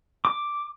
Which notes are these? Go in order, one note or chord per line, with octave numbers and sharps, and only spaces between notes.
D6